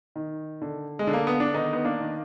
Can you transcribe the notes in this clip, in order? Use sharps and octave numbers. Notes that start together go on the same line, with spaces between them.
D#3
D3
G#3
D3
A#3
B3
D4
D#3 B3 D#4
B3
A#3 D4
D#3